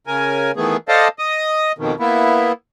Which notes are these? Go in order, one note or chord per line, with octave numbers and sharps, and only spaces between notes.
C#3 A#4 G#5
D#3 E3 A3 B3 G#4
A4 C5 D5 D#5 F5 A5
D#5 D#6
F2 B2 D#3
A#3 B3 E4